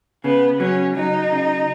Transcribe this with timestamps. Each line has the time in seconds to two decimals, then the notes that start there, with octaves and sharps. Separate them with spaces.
0.24 C#3 B3
0.60 F#3 C#4
0.95 F#3 D#4
1.32 C#3